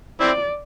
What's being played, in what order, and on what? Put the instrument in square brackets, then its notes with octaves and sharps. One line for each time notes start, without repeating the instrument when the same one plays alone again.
[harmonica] C4 E4 [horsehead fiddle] D5